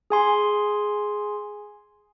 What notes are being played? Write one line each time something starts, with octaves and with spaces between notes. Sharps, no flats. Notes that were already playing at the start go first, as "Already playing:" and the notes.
G#4 G#5 C6